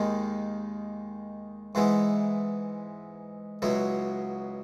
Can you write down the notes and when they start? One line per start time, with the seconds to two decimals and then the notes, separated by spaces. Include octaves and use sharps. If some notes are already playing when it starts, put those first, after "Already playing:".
Already playing: D#2 D#3 G#3
1.75 G#2 E3 G#3 B3 E4
3.62 C#2 B2 F#3 B3 E4